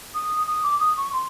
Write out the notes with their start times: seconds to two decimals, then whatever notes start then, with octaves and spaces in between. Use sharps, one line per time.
0.14 D#6
0.46 D#6
0.63 D6
0.79 D#6
0.96 C#6
1.12 C6